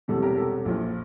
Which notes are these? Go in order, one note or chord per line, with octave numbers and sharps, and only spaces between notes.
E1 E2 C3 G3 A4
G4 A#4
A4
A#1 A#2 F3